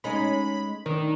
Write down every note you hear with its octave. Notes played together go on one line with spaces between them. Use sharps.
G#3 C#4 D#4 B5
D#3 D4